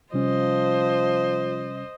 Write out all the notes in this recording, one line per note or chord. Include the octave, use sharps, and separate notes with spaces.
C3 F3 G3 C#4 C5 D#5